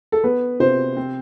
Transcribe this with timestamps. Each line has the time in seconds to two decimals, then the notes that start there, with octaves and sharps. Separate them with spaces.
0.12 A4
0.24 B3 B4
0.60 C3 C5
0.97 C4